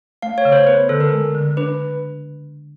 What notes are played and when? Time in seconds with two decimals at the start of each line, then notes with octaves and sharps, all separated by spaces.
0.22 A3 F5
0.38 C#5
0.45 C#3
0.52 C5
0.67 B3 B4
0.89 D3 A4
1.00 A#4
1.12 G#3
1.34 D3
1.57 D4 B4